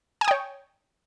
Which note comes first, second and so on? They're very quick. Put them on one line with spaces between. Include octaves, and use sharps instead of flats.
G#5 D#6 G5 C#5